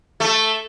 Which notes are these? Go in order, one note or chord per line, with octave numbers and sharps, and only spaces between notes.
A3